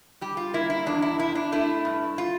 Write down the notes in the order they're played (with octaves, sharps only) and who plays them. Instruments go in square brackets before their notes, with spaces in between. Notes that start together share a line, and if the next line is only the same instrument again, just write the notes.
[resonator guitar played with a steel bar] G3 G4
F4
A#3 E4
E4
E2 D4
E4
C3 E4
D4
A3 E4
G2
F4